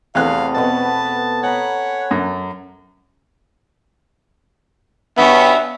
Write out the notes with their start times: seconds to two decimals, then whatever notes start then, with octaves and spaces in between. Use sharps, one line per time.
0.15 E2 C3 A3 B3 F5 F#6
0.55 B2 A3 B3 B4 A5
1.43 C#5 F#5 G#5 A#5 B5
2.11 F#2
5.18 G2 F#3 B3 C#4 E5